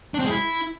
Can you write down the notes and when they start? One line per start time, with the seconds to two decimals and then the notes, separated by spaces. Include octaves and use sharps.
0.14 D4
0.19 C4
0.24 G#3
0.29 E4